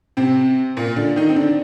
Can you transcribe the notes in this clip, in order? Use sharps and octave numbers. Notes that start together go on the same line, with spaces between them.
C3 C4
A#2 A#3
D3 D4
D#3 D#4
C4
D3 D4